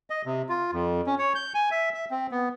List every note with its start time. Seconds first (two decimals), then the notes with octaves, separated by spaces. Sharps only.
0.10 D#5
0.26 C3
0.49 F4
0.73 F2
1.07 C#4
1.19 C#5
1.35 G6
1.55 G#5
1.71 E5
1.94 E5
2.11 C4
2.31 B3